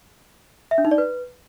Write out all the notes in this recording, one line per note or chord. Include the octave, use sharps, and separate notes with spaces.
E5
D4
D#4
D5
B4